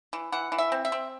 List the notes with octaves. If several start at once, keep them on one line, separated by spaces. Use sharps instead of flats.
E3
E3 F#5
E3
E5
C4
E5
C4